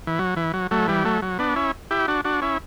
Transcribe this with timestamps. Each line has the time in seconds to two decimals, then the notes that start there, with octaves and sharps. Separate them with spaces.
0.07 E3
0.19 F#3
0.36 E3
0.54 F#3
0.71 F#3 A3
0.88 E3 G3
1.05 F#3 A3
1.22 F#3
1.39 B3 D4
1.56 C#4 E4
1.91 E4 G4
2.08 D4 F#4
2.25 D4 F#4
2.42 C#4 E4